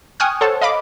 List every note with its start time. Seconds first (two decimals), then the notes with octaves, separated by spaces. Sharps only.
0.20 G5 G#5 C#6 D#6 F6 F#6
0.41 A4 C5 C#5 F#5 A5
0.61 D#5 F5 B5 D6